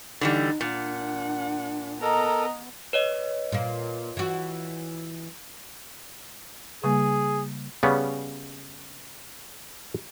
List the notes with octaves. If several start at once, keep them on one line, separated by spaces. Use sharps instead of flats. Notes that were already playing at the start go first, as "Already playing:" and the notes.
D3 E3 G3 D#4
A#2 D4 F#5
B3 A4 A#4 D#5 A#5
B4 C#5 D#5
A#2 A#3
E3 F#4
C#3 G3 A#3 G#4
C#3 G3 B3 C#4